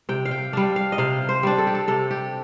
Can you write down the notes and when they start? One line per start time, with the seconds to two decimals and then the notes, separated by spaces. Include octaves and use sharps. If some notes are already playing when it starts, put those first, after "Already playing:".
0.09 C3 G5
0.25 F5
0.31 G5
0.53 G3 D4 F5
0.76 F5
0.92 D#5
0.98 C3 F5
1.29 C5
1.43 G3 D4
1.58 A4
1.67 G4
1.75 A4
1.88 C3 A4
2.11 G4